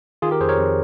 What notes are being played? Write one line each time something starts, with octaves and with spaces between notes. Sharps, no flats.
D#3 F4 G#4
G4 A#4
F2 G#4 C5
A#4 C#5
F2